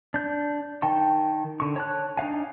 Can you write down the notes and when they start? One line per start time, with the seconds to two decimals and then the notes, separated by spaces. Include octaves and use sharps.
0.14 D4 G6
0.82 D#3 G5 A5 C#6
1.60 D3 C#6
1.76 C#5 A5 F#6
2.17 D4 D#4 F5 G#5